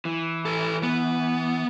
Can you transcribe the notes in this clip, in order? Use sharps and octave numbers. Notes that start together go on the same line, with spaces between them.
E3
A4 B4
B3